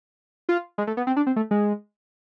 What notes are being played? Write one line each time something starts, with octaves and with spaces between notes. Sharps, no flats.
F4
G#3
A3
B3
C4
D4
C4
A3
G#3